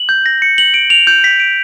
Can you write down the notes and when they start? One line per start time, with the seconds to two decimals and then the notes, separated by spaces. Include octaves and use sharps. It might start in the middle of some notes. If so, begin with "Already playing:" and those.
Already playing: F#7
0.09 G6
0.26 A#6
0.42 C#7
0.58 F#7
0.74 D7
0.90 F7
1.07 G6
1.24 B6
1.40 D7